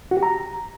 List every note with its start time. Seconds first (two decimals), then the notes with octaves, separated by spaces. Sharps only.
0.11 F#4
0.17 G4
0.23 A#5